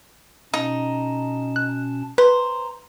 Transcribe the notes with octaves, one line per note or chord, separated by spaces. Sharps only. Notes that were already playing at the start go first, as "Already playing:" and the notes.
B2 C#4 D#4 A5
F#6
B4 C5 A#5